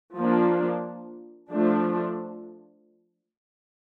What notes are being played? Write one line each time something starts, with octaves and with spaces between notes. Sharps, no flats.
F3 A#3 D4
F3 A3 D4